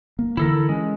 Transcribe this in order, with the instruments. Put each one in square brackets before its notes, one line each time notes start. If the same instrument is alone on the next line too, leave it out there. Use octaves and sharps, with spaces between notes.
[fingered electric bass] A#3
[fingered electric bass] D3 E3 [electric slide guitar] E4 A4 A#4
[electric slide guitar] G#3 [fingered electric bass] C#4